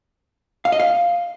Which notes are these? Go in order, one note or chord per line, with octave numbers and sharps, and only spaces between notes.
F5
D#5
F5